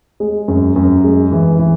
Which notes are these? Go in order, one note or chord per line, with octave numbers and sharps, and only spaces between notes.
G#3
F#2
F#2
G#3
E3
E3